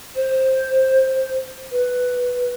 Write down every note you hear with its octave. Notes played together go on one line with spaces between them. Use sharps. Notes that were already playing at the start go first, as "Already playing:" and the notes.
C5
B4